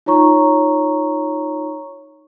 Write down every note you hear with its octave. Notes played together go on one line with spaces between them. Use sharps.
D#4 F4 C#5 A#5 C#6